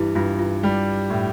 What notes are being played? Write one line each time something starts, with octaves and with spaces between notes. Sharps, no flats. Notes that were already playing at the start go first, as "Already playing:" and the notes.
Already playing: G2 E3 E4 G4
G2 F4
F4
G3
A2